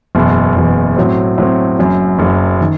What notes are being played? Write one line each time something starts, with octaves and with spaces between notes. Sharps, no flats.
F#1 E2 B2
F#1 E2 B2
A2 F#3 C4
A2 F#3 C4
F#1 F#2 F#3
F#1 F#2 F#3
D#3